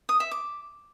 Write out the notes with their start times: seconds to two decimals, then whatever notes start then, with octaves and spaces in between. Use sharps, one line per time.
0.09 D#6
0.20 E5
0.31 D6